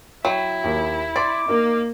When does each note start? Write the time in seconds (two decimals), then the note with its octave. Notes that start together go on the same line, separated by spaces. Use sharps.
0.25 F#3 E4 G5
0.64 D#2
1.16 D5 C6 D6
1.48 A#3 D#4 A#4